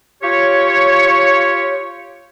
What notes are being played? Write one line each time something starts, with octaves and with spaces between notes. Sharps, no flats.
F4 G4 C#5